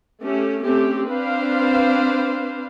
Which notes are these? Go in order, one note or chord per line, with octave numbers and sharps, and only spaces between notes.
A3 C#4 G4
A3 C4 C#4 G4
C4 D4 B4 C5 F5